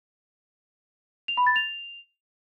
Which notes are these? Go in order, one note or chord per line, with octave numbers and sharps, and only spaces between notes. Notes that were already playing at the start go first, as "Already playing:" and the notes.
F7
B5
A6
F7